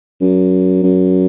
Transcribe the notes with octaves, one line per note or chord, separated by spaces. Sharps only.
F#2
F#2